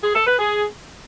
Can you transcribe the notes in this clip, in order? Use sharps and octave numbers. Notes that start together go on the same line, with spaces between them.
G#4
A4
B4
G#4